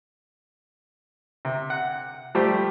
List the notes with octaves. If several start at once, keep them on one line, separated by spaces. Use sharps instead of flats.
C3
F#5
F3 G3 A3 G4 C5 D6